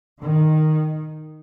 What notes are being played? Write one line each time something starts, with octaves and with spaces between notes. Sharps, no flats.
D#3